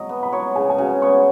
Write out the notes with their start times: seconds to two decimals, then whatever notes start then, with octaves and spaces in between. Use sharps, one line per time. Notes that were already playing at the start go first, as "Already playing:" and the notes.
Already playing: F#3 D#5 D#6
0.09 B3
0.23 B5
0.33 F#3 C#5 C#6
0.55 C#3 G#4 G#5
0.70 G#5
0.78 C#3 F#4 F#5
1.02 B3 C#5 C#6